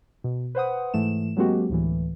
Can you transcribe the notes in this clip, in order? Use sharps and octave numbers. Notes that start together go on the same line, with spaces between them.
B2
B4 C5 F#5 D#6
G#2 E3 A3 E7
F#3 G#3 A#3 C4 F#4 G4
D2 A2 E3